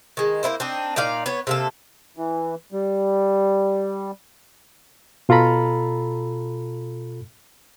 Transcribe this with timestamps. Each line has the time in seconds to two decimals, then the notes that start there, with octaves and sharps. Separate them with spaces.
0.17 D#3 G#3
0.43 A#3 D4 E4 C5
0.60 C4 D4 D#4
0.96 A#2 D#4 D5 F5
1.26 B3 C#5
1.47 C3 A#3 A4
2.17 E3
2.72 G3
5.29 B2 F4 A4 A#5 B5